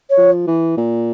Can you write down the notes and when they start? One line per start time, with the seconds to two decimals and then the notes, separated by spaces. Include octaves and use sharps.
0.10 C#5
0.17 F3
0.47 E3
0.78 A#2